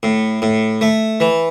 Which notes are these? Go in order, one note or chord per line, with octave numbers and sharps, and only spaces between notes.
A2
A2
A3
E3